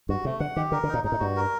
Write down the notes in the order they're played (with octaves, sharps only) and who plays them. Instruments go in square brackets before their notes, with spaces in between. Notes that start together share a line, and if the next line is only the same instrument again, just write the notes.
[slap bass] G2 [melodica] F#4
[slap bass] C3 [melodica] A3
[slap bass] D3 [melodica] F#5
[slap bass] D#3 [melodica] G4
[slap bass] D3 [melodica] A#4
[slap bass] D3
[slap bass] A#2 [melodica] D#4
[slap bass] G2 [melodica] D#4
[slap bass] A2
[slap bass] G2 [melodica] F#4
[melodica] A#4